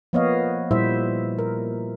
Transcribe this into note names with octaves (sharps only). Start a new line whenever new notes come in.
F3 A#3 B3 C#5 D#5 F5
A#2 G3 E4 C5 E5
A#4